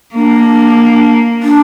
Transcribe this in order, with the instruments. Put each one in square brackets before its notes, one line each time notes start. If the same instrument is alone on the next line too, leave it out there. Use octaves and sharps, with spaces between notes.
[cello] A#3 [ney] D4
[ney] D4